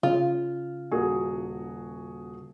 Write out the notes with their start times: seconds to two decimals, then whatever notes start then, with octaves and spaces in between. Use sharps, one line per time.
0.03 C#3 F4
0.91 D#1 F#4 G#4